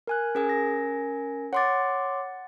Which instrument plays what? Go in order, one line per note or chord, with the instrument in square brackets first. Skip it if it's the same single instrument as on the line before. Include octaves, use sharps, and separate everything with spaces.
[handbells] A#4 G#5 F#6
[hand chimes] C#4 A#4 G#5 [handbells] G#4
[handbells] A#6
[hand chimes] C#5 C6 D6 [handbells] F#5 A6